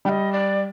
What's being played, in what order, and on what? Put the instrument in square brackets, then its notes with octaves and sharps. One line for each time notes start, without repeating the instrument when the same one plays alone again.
[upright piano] G3 [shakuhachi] G5
[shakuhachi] D#5
D5